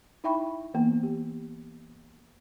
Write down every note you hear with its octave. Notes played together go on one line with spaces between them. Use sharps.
D#4 E4 E5 G5 B5 C#6
E3 A#3 B3
G4